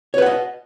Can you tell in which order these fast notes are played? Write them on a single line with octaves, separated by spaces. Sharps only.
C#5 B4 F#5 D#5